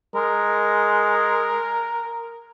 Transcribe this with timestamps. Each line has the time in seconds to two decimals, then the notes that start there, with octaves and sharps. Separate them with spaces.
0.15 G#3 A#4